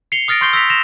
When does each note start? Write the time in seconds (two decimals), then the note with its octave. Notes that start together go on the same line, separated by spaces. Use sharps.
0.12 C7 C#7 F7 G7
0.28 D#6 F6 A6 A#6 D7
0.41 C6 C#6 G6 C7 G7
0.53 E6 A#6 B6 F7
0.70 A#6 E7 F7